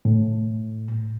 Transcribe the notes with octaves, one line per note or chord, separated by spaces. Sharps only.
A2